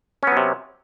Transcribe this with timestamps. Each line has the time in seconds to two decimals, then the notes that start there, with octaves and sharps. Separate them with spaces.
0.23 C#4
0.27 B3
0.32 F#3
0.37 C3